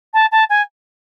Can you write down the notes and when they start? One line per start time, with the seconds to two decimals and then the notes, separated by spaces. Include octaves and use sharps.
0.14 A5
0.32 A5
0.50 G#5